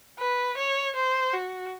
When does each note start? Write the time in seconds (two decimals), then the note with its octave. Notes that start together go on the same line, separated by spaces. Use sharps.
0.19 B4
0.57 C#5
0.96 C5
1.33 F#4